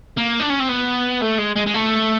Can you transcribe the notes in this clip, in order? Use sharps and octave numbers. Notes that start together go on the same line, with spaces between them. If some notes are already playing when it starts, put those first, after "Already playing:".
A#3
D4
C#4
C4
B3
A3
G#3
G#3
G#3
A3